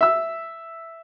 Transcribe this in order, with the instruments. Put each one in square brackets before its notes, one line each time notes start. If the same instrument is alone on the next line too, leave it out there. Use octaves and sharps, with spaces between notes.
[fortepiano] E5 E6